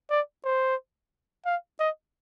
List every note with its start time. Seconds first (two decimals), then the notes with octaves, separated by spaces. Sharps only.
0.10 D5
0.45 C5
1.46 F5
1.80 D#5